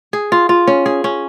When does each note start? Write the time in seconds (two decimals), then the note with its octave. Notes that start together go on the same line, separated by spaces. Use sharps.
0.13 G#4
0.32 F4
0.49 F4
0.67 C#4
0.86 G#4
1.04 C#4